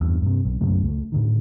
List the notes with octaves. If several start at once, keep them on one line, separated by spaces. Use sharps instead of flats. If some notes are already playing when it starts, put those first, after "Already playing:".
E2 G2
G2 C3
B1
B1 F#2 C#3 A3
C#2 A3
A2 D3 D#3